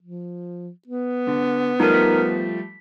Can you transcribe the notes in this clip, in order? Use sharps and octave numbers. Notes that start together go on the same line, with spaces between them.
F3
B3
D3
F3 G3 A3 D#4 A#4
B6